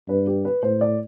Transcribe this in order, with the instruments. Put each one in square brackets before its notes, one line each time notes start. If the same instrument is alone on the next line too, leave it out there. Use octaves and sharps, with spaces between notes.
[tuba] G2 [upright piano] B4
[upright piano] G4
B4
[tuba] A2 [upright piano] C5
[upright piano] D5